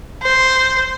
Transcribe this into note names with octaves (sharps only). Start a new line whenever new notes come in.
C5